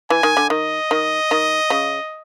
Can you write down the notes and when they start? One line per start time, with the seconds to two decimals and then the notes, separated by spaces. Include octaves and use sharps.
0.10 E3 G#5
0.23 D#3
0.37 D3
0.50 D#3 D#5
0.91 D#3
1.31 D#3
1.70 C#3